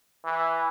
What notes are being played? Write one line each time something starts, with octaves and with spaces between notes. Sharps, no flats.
E3